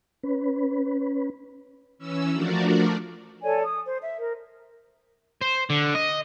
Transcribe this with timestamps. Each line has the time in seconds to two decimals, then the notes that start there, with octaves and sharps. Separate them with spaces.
0.23 C#4 B4
1.98 E3 C#4 E6
2.33 F3 A3 D4 F#4 A#4 D5
3.43 A4 C#5 D5 G#5
3.64 D#6
3.85 C5
4.02 E5
4.17 A#4
5.41 C5
5.70 D3
5.95 D#5